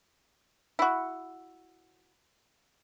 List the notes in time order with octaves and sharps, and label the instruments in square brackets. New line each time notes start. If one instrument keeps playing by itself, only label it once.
[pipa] E4 F#4